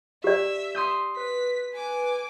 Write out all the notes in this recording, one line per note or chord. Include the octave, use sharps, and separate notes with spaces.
G4 D5 E5
C6 D#6 G6
B4 B6
G#5 D6